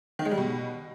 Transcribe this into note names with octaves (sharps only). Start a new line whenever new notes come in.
D#3
G#3
G3
B2